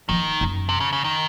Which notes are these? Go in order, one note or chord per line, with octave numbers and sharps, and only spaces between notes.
D#3 F3
F#2
C3
C#3
C#3
D#3